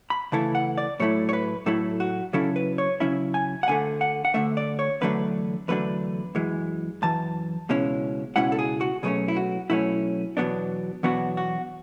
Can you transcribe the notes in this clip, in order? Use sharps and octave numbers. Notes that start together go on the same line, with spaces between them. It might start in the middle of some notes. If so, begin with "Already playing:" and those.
B5
C#3 E3 A3 E4 A5
F#5
D5
A2 F#3 A3 E4 C#5
C#5
B4
A2 F#3 A3 E4 A4
F#4
C#3 F#3 C#4 E4 A4
B4
C#5
C#3 F#3 C#4 E4 E5
G#5
F#5
D2 D3 A3 G#5
F#5
F#5
D2 D3 A3 E5
D5
C#5
E2 D3 F#3 A3 D4 B4
E2 D3 F#3 A3 D4 B4
F#2 E3 G#3
F#2 E3 A5
C#2 B2 G#3 C#4 E4
C#2 B2 G#3 C#4 E4 F#5
A4
G#4
F#4
B2 F#3 A3 C#4 G#4
E4
F#4
B2 F#3 A3 C#4 E4
E2 B2 F#3 B3 D4
E2 B2 F#3 B3 D4 F#4
F#4